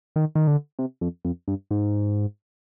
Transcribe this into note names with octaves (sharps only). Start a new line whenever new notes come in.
D#3
D#3
D3
C3
F2
F2
G2
G#2